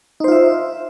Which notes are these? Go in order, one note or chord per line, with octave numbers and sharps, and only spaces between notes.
D#4 F4 C5 E5